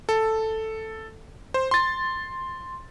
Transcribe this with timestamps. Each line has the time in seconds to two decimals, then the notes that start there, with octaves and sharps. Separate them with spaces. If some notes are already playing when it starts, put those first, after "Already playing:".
0.09 A4
1.54 C5
1.71 C6 A6